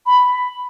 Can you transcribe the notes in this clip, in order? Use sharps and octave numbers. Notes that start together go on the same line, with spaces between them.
B5